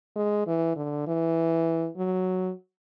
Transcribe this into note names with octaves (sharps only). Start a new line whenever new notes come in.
G#3
E3
D3
E3
F#3